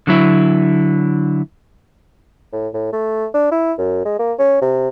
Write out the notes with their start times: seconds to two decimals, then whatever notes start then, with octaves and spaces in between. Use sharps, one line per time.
0.07 D3 F#3 E4
2.52 A2
2.74 A2
2.92 A3
3.34 D4
3.51 E4
3.78 F#2
4.05 G#3
4.19 A#3
4.39 C#4
4.62 C3